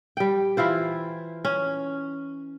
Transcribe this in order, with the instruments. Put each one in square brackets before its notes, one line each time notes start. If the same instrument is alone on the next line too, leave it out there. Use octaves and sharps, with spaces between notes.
[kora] G3 G5
E3 E4 F4 C5
C#4